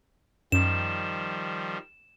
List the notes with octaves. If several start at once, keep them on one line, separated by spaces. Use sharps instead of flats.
F#2 D#3 F3 G3 E7